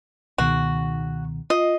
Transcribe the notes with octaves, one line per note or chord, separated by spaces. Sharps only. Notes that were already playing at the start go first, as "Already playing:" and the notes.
C#2 B2 D#3 F#4
F4 D#5